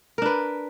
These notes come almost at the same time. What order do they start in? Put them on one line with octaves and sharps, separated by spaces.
A#4 D4 B4